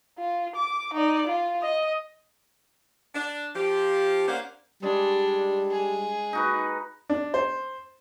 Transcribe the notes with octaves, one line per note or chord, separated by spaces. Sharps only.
F4
D6
D#4 D5
F4
D#5
D4
F3 G4
A#3 C#4 D4 C5 F5 F#5
G3 G#3 D4
G#4
D#4 F#4 B4
D4
C5